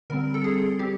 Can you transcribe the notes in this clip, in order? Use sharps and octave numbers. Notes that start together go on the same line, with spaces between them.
D3 G3 C4 A#4
A4
G#4
G3 C4 G4